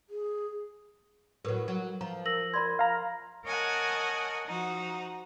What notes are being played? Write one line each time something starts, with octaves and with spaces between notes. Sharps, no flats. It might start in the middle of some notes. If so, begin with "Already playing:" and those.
G#4
A2 F#3 A#4 B4
F#3
F3 A#5
A#4 E6 A#6 F#7
A#4 D5 B5 C6 G#6
F5 A#5
A#4 C#5 D#5 F#5 G#5 A5
F3 D#4 F#4